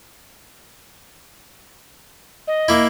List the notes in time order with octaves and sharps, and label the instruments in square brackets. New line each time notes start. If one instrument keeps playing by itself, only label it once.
[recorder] D#5
[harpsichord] A#3 E4